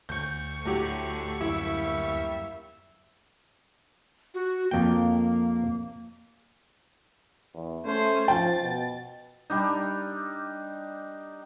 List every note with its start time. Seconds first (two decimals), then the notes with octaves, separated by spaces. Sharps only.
0.09 D2 C#6 G6
0.65 A2 D3 F#3 G4
1.41 F#2 G3 A#3 E4 E5
4.34 F#4
4.71 F2 A#3 G5
7.54 E2
7.85 A3 C#4 C5
8.28 F3 G5 A6
8.62 B2
9.50 G3 D4 D#4